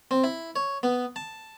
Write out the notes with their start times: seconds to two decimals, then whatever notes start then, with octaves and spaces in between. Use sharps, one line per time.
0.11 C4
0.24 E4
0.56 C#5
0.83 B3
1.16 A5